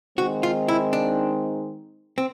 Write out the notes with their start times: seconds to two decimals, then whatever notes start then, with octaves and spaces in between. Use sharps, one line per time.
0.18 D#3 G#3 C4 D#4 F#4
0.43 F4
0.68 E4
0.93 D4
2.18 C4